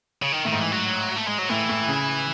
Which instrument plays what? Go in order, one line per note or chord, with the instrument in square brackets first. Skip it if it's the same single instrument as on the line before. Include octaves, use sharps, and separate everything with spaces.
[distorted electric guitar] C#3
D#3
[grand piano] A2 [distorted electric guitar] D#3
[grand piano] G#2
[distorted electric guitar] E3
F#3
A3
G#3
F#3
[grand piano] A2 [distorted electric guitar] E3
[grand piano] A2
C#3